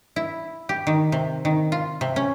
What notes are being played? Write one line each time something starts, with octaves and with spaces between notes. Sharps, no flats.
E4
G4
D#3
C3
D#3
F4
C3
C#4